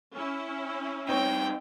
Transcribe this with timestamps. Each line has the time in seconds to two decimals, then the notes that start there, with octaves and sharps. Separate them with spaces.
0.16 C#4 E4
1.09 G2 C4 D#4 C#5 G5